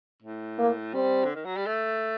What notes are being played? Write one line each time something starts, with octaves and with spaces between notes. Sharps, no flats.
A2
A#3
G3 C4
D3
D#3
F#3
G3
A3